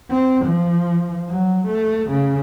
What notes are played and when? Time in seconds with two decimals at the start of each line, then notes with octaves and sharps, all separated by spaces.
0.11 C4
0.45 F3
1.30 F#3
1.68 A3
2.11 C#3